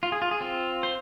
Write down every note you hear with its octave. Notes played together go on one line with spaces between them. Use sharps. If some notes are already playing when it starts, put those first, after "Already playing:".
F4
G#4
F4
G#4
C4 F4
C5